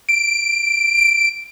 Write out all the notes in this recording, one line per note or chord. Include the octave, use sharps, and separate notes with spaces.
D7